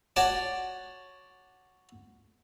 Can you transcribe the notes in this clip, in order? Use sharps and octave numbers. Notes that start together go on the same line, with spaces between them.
F#4 C#5 D5 A5 D6